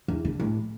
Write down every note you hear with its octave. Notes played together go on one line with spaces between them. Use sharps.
E2
D3
A2